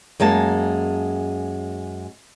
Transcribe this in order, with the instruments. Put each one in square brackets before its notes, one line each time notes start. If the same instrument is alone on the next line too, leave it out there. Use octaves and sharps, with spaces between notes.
[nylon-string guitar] F#2 G#3 A#3 A5